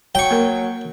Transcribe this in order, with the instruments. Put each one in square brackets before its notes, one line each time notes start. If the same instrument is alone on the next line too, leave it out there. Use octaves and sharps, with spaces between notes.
[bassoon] F#3 [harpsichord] G5 C#6
[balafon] A#3 A#4